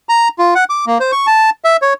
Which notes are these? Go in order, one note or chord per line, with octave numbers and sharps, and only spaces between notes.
A#5
F4
F#5
D6
A#3
C5
C#6
A5
E5
C#5